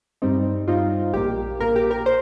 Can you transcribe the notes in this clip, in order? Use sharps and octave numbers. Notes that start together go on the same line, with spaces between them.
G2 G3 C4 D#4
G2 G3 C4 D#4 F4
A#1 A#2 A#3 G4
A#1 A#2 A#3 A#4
G4
A#4
C5